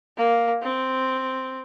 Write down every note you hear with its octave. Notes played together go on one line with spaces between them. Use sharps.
A#3
C4